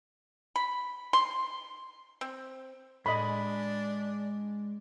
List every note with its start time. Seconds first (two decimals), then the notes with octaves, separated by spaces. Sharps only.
0.56 B5
1.13 C6
2.21 C4
3.06 A2 G#3 D4 D#5 B5 C6